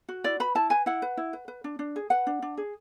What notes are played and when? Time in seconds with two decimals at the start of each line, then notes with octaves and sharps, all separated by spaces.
0.09 F#4
0.24 E4 D5
0.40 B4 B5
0.55 E4 A5
0.70 B4 G#5
0.86 E4 F#5
1.02 B4
1.17 E4
1.33 B4
1.48 B4
1.64 D4
1.79 D4
1.96 G#4
2.10 B4 F#5
2.27 D4
2.42 D4
2.57 G#4